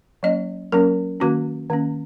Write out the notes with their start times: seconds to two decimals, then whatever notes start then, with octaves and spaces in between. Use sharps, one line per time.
0.23 F#3 A#3 C#4 D#5
0.72 F#3 A#3 C#4 A#4
1.20 D#3 A#3 C#4 F#4
1.70 D#3 A#3 C#4